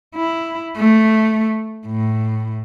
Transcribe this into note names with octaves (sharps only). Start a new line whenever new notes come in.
E4
A3
A2